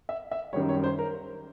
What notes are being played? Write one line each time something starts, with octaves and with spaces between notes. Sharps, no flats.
E5
E5
F#2 D#3 G3 C#5
C#5
C5
A#4